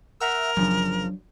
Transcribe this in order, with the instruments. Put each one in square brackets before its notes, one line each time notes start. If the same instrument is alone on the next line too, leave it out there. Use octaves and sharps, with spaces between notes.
[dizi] A#4 [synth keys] E5 F#5 E6
[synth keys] G1 C#3 F3 [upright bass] F#3 D4